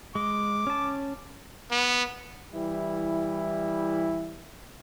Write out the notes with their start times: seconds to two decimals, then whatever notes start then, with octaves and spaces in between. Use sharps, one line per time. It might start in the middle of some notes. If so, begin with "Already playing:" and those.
0.15 G#3 D6
0.67 C#4 A5
1.72 B3
2.53 E3 G3 E4